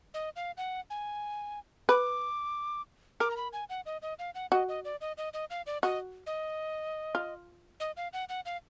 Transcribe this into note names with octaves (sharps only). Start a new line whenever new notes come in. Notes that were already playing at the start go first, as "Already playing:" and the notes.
D#5
F5
F#5
G#5
B4 D6
A#4 D6
A#5
B5
G#5
F#5
D#5
D#5
F5
F#5
F#4 D#5
D#5
D5
D#5
D#5
D#5
F5
D5
F#4 D#5
D#5
F4
D#5
F5
F#5
F#5
F5